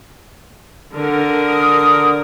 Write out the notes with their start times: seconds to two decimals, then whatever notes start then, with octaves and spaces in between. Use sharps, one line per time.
0.95 D3 A#4
1.50 D#6